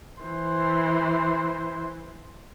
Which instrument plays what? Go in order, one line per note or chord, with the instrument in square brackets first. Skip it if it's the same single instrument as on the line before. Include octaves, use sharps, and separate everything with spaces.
[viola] E3 C5